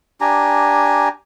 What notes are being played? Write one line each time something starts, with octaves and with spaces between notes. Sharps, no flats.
D4 G4 G#5 A#5